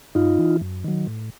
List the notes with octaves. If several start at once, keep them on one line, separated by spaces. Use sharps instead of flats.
G2 D#4 F4
E3
F#2
D#3 F#3
A2